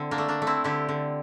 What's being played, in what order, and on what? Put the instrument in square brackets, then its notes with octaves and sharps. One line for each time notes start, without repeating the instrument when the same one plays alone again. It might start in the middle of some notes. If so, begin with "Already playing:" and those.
Already playing: [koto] D3 C4 E4
A#3 D4
A3
A#3 D4
A3
C4 E4
D3 E4 G4
D3